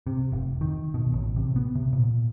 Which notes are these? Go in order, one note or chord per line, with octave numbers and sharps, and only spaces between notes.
C3
F1
D#3
B2
A1
C3
B3
C3
A#2